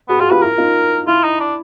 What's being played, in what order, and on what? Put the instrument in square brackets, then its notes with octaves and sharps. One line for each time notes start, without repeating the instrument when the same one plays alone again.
[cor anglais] B3 [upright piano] F#4 G#4
[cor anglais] F4 [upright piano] F#4 G#4
[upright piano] F4 G4 [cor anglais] B4
[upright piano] E4 F#4 [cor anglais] A#4
[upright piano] D#4 F4
[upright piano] E4 [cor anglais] F4
[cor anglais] D#4
D4